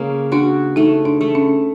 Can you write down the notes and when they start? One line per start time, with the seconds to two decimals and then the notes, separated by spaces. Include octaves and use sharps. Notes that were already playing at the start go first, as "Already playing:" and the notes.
Already playing: C#3 A#3
0.32 D4 F#4
0.76 A3 D#4
1.05 D4
1.21 A3
1.35 C#4